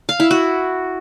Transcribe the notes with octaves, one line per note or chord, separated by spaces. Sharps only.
F5
E4
F#4